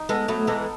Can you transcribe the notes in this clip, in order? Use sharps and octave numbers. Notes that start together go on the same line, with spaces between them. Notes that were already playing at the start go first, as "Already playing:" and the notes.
Already playing: D#4
G#3 B3 A4
F#3 A3 B3
E3 G#3 A4